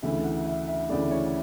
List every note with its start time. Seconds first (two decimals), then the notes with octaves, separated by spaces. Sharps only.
0.02 D2 C#3 E3 A3 E5
0.24 F#5
0.46 E5
0.68 E5
0.89 D2 C#3 E3 A3 D5
1.11 C#5